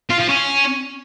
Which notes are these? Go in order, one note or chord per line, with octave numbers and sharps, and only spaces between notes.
F4
F3
C#4